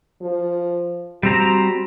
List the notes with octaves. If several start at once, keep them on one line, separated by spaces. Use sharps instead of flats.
F3
G3 C4 F#4 A#5